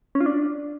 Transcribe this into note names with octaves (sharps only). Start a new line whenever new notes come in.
C#4
F4
D4